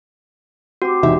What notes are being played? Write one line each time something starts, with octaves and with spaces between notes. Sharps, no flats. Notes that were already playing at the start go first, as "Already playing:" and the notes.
C4 F#4 G4
E1 D#4 E5